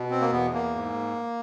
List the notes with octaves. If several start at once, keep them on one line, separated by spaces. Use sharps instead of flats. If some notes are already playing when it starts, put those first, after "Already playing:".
Already playing: B2
C4
A#3
E2 B3
A#3
G#2